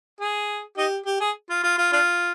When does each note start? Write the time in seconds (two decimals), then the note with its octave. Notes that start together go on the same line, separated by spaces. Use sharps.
0.21 G#4
0.78 D#4 G4
1.06 G4
1.20 G#4
1.50 F4
1.63 F4
1.78 F4
1.93 D4 F4